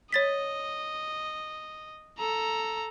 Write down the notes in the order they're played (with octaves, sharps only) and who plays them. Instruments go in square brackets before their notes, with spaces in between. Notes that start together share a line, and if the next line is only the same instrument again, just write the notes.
[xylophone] C#5 A6 B6 [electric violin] D#5
[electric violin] A4 A#5